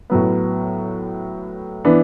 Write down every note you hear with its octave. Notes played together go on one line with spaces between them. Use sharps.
A2 F#3 B3
E3 B3 D4